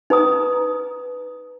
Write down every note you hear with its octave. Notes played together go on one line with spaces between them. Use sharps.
D#4 B4 A#5 D#6